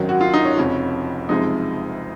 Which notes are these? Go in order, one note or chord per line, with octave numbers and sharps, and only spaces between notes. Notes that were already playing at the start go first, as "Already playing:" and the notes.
Already playing: G#1 F#2 D#3 F#3
F#4
F4
D#4
C#4
F1 F2 C#3 F3
F#1 F2 C3 F3 G#3 D#4